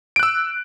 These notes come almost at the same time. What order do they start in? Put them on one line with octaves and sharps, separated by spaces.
D7 F#6 E6